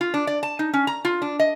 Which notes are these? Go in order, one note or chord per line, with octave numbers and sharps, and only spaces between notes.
F4
D4
D5
A5
D#4
C#4
A#5
F4
D4
D#5